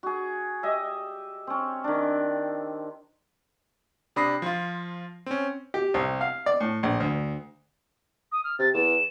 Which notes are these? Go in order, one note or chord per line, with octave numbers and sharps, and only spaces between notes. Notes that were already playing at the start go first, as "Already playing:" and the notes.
F#4 G#4
G4 D#5 E5
C4 C#4
D#3 D4
C3 D4 B5 D#6 A#6 C7
F3 F4
C4 C#4
G4
C2
F5
D5
A2
A#1
D2
D#6
F6
C3 A6
E2 E7